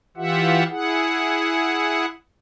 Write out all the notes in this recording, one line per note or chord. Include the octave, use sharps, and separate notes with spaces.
E3 F4 G4 E5 F#5
E4 G#4 F#5